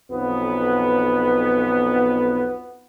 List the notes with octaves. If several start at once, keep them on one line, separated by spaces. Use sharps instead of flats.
B1 F2 B3